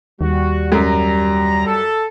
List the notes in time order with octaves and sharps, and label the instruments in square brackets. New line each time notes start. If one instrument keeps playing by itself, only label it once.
[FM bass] D#2 [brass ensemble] G3 [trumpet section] F#4
[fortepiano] F#2 [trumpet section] A#5
[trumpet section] A4